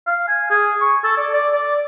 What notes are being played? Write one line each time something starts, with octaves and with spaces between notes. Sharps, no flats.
F5
G#5
G#4
C#6
A4
D5
D5
D5